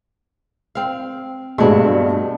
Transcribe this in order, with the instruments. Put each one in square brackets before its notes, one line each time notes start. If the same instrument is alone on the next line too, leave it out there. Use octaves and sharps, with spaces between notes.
[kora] C4 F5
[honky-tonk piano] G2 B2 A3 [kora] G#3 D4